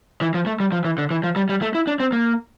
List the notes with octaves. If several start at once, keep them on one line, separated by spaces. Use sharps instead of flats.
E3
F3
A3
G3
F3
E3
D3
E3
F3
G3
G3
A3
E4
D4
C4
A#3